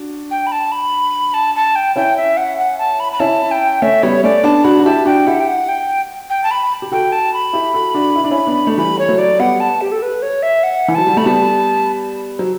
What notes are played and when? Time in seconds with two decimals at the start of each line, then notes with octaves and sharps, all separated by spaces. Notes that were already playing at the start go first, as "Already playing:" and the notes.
Already playing: D4 F#4
0.31 G5
0.47 B5
0.52 A5
0.72 B5
1.34 A5
1.55 A5
1.76 G5
1.96 C#4 E4 G5
2.17 E5
2.37 F#5
2.58 F#5
2.79 A5
3.00 B5
3.12 B5
3.20 C#4 E4 A5
3.51 G5
3.82 A3 C#4 E5
4.03 G3 B3 C#5
4.24 A3 C#4 D5
4.44 B3 D4 A5
4.64 D4 F#4 B5
4.79 F#4
4.85 E4 G4 A5
5.05 D4 F#4 G5
5.27 E4 G4 F#5
5.40 G5
5.48 F#5
5.69 G5
6.30 G5
6.43 A5
6.51 B5
6.82 G4
6.92 F#4 A4 G5
7.12 A5
7.33 B5
7.53 E4 G4
7.74 F#4 A4
7.95 D4 F#4
8.16 E4
8.24 D4
8.31 C#4 E4
8.47 B3 D4
8.67 A3
8.77 E3 G3 B5
8.99 C#5
9.09 F#3 A3
9.18 D5
9.39 G3 B3 F#5
9.60 A5
9.81 G4
9.92 A4
10.02 B4
10.22 C#5
10.43 E5
10.63 F#5
10.88 E3
10.95 F#3 A5
11.07 G3
11.17 A3 B5
11.25 G3 B3 A5
12.39 F#3